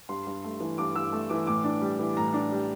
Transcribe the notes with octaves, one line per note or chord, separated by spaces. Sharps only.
G2 C6
G2
A3
E3
G2 D6
G2 E6
A3
E3 D6
A2 D6
D4
G3
E3
A2 A#5
D4
G3